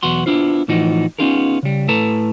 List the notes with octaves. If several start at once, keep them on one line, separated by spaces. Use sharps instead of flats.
B1 E2 B3 F#4 C6
B3 D4 E4 F4 C5
A2 E3 F3 D#4 F#4
B3 C#4 D#4 F4 G#4 A#4
C#3 G3
A2 A4 B4 A5 A#5